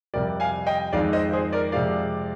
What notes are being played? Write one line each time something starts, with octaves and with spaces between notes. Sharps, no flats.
F2 C3 G3 A#4 D5
F5 G#5
D#5 G5
F2 D#3 G#3 D5 F5
C5 D#5
G#4 C5
A#4 D5
F2 C3 F3 G#3 D5 F5